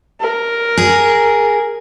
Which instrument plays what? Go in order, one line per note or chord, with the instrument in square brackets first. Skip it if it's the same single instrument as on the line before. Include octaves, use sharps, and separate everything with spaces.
[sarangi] A#4
[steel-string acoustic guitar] G#4